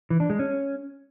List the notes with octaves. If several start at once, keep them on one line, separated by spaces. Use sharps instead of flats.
E3
D4
G#3
C#4